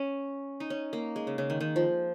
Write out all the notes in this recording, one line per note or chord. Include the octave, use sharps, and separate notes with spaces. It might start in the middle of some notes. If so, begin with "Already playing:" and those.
Already playing: C#4
D#4
C#4
A#3
G#3
C#3
C#3
D#3
D#3
F3